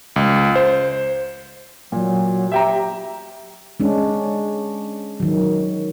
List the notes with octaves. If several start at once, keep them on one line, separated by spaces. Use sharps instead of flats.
C#2
C5
A#2 F#3
G4 E5 G5 A#5
G#3 C#4 D4
D#3 F#3